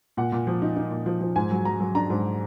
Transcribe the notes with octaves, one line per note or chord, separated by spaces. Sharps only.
A#2 F#5
A#2
F3
D#4
D#4
A#2
F3
F3
G#2 G#5
F#3
F#3 A#5
F#3
D4 A#5
G#2